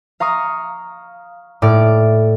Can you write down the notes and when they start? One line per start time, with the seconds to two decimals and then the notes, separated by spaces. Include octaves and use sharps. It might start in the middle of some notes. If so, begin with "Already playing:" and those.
0.20 F5 A#5 C#6 D#6
1.62 A2 D5 F6 D7